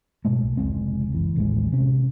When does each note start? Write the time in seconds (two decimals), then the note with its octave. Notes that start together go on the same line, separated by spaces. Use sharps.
0.25 G#2 B2 G#3 A3
0.42 B1
0.57 F1 C#2 G#3 C4
1.12 F#1 E3
1.36 A1 D#2 A2 G#3
1.72 C3 C4 C#4